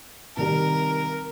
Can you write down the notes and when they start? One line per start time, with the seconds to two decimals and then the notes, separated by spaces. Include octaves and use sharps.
0.37 C3 D#3 G3 A#4